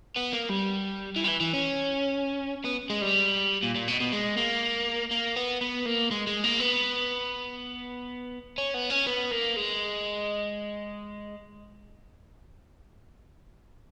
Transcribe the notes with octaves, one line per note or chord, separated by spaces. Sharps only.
B3
A#3
G3
E3
G3
E3
E3
C#4
B3
G#3
G3
A#2
A#2
B2
B2
G#3
A#3
A#3
B3
B3
A#3
G#3
G#3
A#3
B3
C#4
B3
C#4
B3
A#3
G#3